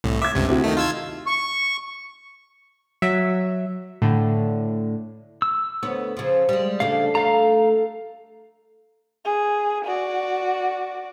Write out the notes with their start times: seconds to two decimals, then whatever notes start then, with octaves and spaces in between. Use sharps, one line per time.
0.04 C2 A2
0.22 E5 D6 G#6
0.35 C#2 G2 C3
0.48 D2 C3 E4 F#4
0.64 D#3 A3 D#4
0.77 F4 E6 G#6
1.27 C#6
3.02 F#3 E5
4.02 A2 D3
5.42 E6
5.83 D2 B3 C#5
6.17 C#3 F3
6.49 G3 G#3
6.80 C#3 A3 D4 F5
7.15 A3 F5 A#5
9.25 G#4
9.85 F#4 D5